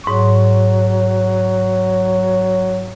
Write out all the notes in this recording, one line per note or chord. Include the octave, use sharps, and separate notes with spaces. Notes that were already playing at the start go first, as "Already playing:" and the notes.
G#2 F#3 C#6